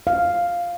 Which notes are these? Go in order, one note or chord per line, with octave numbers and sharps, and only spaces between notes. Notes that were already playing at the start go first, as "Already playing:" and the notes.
F5